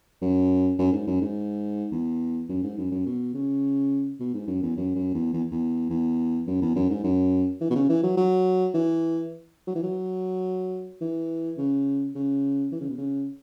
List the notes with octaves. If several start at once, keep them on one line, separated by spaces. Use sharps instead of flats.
F#2
F#2
G#2
F#2
G#2
E2
F#2
G#2
F#2
F#2
B2
C#3
B2
G#2
F#2
E2
F#2
F#2
E2
E2
E2
E2
F#2
E2
F#2
G#2
F#2
E3
B2
C#3
E3
F#3
F#3
E3
F#3
E3
F#3
E3
C#3
C#3
E3
C#3
B2
C#3